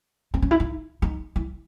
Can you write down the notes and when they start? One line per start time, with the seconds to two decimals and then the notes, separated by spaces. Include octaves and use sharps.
0.34 C4
0.42 C#4
0.51 E4
0.60 D#4
1.02 D#4
1.36 E4